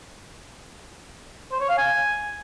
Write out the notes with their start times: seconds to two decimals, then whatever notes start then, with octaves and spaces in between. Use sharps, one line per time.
1.52 C5
1.60 C#5
1.69 F5
1.78 G#5